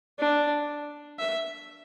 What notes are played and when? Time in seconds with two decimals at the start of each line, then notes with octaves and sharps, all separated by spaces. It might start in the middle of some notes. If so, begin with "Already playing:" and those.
0.19 D4
1.19 E5